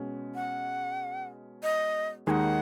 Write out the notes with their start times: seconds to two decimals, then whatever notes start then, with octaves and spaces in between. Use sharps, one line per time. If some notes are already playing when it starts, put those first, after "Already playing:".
Already playing: B2 G#3 C#4
0.35 F#5
1.63 D#5
2.27 D#2 D#3 G#3 D#4 F#5 G#5